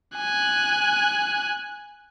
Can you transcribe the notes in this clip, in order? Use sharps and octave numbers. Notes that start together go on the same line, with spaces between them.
G#5 F#6